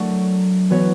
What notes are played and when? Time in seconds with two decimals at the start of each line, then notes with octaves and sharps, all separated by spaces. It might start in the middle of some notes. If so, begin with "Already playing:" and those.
Already playing: F#3 A3 D4 A4
0.70 E3 B3 F#4 C#5